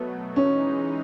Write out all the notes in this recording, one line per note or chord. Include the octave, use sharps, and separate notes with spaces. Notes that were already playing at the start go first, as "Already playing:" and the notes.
Already playing: B2 F#3 A3 B3
E3 G#3 C#4 D#4